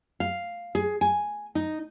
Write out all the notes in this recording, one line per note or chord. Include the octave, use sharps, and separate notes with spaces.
F5
G#4
G#5
D#4